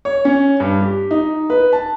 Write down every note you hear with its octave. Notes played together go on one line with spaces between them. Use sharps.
C#5
C#4
G2
G4
D#4
B4
A5